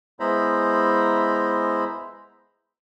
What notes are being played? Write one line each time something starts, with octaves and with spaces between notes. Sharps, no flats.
G#3 B3 E4 C5 A#5 B5